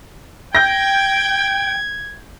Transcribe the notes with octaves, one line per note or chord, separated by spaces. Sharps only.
G5 G6 G#6 A#6